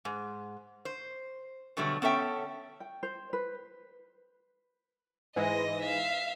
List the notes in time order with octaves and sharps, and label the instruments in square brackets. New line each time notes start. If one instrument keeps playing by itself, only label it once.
[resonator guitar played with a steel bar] G#2
C5
B2 D3 F#3 G3 A3
B3 C#4 A4 E5 G5
[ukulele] G5
C5
B4
[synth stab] G#2 E3 G#3 [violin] D#5 A#6
[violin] E5 F5